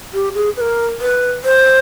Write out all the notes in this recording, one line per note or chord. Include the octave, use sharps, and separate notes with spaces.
G4
G#4
B4
A#4
B4
C5